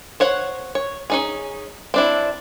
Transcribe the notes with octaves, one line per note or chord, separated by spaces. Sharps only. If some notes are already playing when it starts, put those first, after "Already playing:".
C5 C#5 F#5
C#5
C#4 D#4 G#4
C4 D4 E4